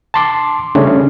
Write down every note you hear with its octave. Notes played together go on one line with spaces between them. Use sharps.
A5 C6 D6
C#3 G3 A3 C#4 D4